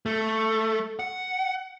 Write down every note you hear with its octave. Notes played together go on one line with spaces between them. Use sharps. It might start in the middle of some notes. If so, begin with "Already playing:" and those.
A3
F#5